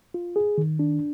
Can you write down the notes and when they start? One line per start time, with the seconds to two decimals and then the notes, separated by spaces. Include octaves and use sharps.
0.14 F4
0.36 G#4
0.58 D#3
0.79 D4